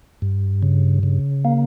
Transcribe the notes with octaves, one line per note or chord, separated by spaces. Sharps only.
G2
C#3
C#3
A#3